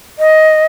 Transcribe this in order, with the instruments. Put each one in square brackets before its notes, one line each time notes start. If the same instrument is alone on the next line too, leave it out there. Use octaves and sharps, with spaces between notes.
[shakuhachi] D#5